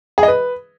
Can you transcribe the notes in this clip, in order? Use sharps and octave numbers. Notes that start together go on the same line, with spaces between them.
G#4
D#5
B4